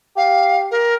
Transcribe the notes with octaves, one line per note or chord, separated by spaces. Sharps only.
G4 F5
A#4